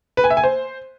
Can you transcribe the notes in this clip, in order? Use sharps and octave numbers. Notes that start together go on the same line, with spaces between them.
B4
G#5
E5
G#5
C5